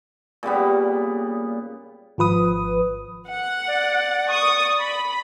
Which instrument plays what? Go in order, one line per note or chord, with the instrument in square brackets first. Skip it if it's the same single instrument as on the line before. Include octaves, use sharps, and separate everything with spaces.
[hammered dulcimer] A#2 C#3 G3 B3
[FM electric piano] G#1 F3 B4 D#6
[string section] F#5
[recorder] D5
[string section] C#6 D#6
B5